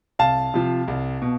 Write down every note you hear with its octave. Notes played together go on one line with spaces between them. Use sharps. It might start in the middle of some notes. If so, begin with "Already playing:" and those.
C2 F5 A5
C3 F3
C2
B2